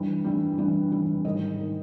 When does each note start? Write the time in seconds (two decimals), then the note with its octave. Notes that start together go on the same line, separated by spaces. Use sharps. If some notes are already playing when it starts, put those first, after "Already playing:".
Already playing: G2 E3 G3
0.24 G2 E3 G3
0.58 G2 E3 G3
0.91 G2 E3 G3
1.25 G#2 D#3 G3 D#5
1.59 D#3 G3